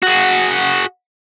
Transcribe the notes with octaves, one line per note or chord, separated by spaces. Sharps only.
F#4 G#4